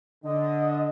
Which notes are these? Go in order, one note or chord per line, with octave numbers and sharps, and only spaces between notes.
D3 D#5